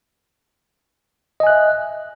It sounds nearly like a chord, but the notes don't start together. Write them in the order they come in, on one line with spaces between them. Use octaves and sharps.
D#5 G#5 F#6 E5